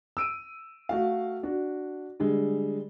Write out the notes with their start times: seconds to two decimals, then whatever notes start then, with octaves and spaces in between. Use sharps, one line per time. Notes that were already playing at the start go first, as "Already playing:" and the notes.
0.17 E6 D7 D#7
0.89 A3 F#4 F5
1.43 D4 F#4
2.20 D3 G3 G#3